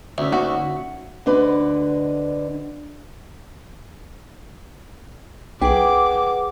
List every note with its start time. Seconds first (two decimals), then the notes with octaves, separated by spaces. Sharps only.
0.18 D2 C#4 E5
0.32 A#3 D#4 F#4 E5 F#5
1.26 D2 D3 D4 B4 D#5
5.61 B1 G#4 B4 F#5 G5 D6